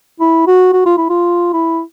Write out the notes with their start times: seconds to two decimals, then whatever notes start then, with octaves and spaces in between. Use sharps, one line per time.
0.20 E4
0.47 F#4
0.73 F#4
0.86 F4
0.98 E4
1.10 F4
1.53 E4